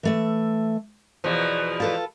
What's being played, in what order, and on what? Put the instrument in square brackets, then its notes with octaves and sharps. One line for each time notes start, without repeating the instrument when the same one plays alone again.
[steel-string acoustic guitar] E3 A3 E5
[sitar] E2 B2 F3 [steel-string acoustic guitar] C#5
[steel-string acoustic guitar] F4 A4 B4